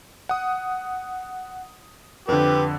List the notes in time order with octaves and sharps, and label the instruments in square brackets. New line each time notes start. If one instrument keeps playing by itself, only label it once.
[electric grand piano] F#5 D#6
[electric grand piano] F2 D3 [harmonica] G4 B4